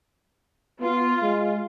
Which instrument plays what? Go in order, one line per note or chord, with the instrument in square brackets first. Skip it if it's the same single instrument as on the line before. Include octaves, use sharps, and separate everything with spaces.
[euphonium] B3 [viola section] F4
[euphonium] G#3